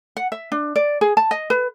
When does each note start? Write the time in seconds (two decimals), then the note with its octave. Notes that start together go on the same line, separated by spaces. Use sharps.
0.17 F#5
0.32 E5
0.52 D4
0.76 D5
1.01 G#4
1.17 A5
1.31 D#5
1.50 B4